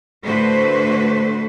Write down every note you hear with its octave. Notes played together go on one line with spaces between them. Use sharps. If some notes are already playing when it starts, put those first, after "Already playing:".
A2 D3 A3 F#4 B4 C5